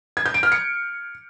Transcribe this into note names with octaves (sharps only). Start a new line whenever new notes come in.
G#6
G6
D7
F6
C#7